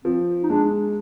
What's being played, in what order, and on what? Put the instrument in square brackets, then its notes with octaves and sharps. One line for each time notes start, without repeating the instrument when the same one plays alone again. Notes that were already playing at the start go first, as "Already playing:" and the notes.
[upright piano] F3 [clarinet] C4
[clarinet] D#4
[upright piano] G#3 [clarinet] D4